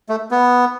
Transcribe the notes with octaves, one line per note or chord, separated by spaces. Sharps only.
A3
B3